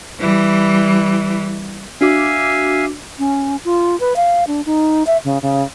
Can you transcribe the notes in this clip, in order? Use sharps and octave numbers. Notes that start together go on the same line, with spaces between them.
E3 G3
D4 F#4 E5 F5 G#5 D6
C#4
F4
B4
F5
D4
D#4
E5
C#3
C#3